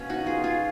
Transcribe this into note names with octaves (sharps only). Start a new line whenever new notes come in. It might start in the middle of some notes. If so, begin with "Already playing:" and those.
Already playing: B2 A#3 C#4
D#4 F#4
F4 G#4
F4 G#4